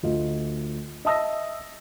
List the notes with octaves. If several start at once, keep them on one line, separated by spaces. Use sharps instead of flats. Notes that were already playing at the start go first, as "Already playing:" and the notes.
D2 F4 D#5
D#5 E5 A5 D#6 E6 A#6